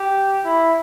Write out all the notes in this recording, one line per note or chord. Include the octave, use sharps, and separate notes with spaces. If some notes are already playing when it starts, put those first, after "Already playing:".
Already playing: G4
E4